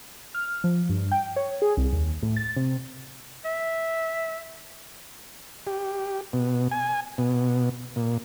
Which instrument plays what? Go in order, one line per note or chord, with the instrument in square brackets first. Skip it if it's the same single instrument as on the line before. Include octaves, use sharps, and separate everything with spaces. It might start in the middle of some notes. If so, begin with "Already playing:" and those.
[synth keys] F6
F3
G2
G5
C#5
G#4
C2
D#2
A2
A6
C3
[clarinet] E5
[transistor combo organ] G4
B2
G#5
B2
A#2